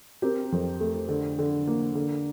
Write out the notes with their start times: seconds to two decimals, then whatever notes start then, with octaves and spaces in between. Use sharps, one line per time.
0.22 C4 G4 A#4
0.52 F2
0.81 A3
1.09 D3
1.39 D3
1.67 A#3
1.95 D3